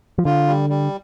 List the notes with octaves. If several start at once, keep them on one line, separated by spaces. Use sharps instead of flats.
F3
D3 F4
G3
G3